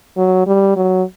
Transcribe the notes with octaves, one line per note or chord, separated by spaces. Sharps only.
F#3
G3
F#3